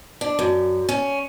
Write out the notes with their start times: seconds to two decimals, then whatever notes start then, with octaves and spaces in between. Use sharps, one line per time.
0.21 D4
0.39 F#2
0.89 C#4